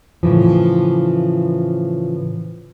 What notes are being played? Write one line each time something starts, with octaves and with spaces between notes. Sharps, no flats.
A2 C#3 E3 F3